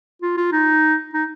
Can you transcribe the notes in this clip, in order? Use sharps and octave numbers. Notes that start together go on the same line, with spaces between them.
F4
F4
D#4
D#4